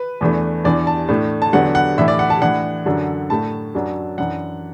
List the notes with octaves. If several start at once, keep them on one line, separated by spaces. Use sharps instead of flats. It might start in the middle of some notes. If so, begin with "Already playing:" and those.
Already playing: B4
E2 E3 A3 D4
E2 E3 D4 D5
A5
A2 A3 D4
A5
E2 D3 F#3 B3 D4 F#5
F#5
A2 E3 D4 E5
D5
F#5
A5
A2 E3 D4 F#5
F#2 D3 F#3 D4
A2 A3 D4 A5
F#2 F#3 D4
F#2 E3 D4 F#5